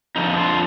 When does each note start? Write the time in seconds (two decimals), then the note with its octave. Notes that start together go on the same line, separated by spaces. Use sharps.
0.16 F2 D3 F3 D#4
0.30 D#4
0.38 F4